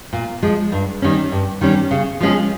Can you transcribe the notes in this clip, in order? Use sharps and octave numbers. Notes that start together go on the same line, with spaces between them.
A#2
F3 G#3
G2
D#3 G3 C#4
G2
D#3 G3 C#4
C#3
F3 G#3 C#4 G#4